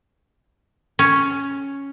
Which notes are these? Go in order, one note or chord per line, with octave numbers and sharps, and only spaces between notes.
C#4